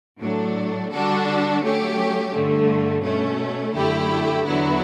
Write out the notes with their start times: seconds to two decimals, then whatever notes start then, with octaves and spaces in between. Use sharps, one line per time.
0.20 A2 F#3 A3 D4
0.92 D3 G3 D4 F#4 A4
1.61 F#3 A3 C#4 G4
2.32 G2 D3 A3
3.03 B2 A3 C#4
3.74 F#2 D3 A3 E4 G4
4.45 E2 D3 F#3 B3 E4